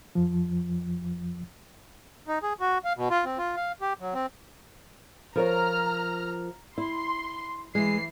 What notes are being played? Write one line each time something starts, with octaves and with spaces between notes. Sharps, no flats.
F2 F3
D#4
G#4
F#4
F5
B2
F4
C4
F4
F5
G4
F#3
C4
F3 A#4 C#5 A#5 F6
E4 C6
E3 G#3 C7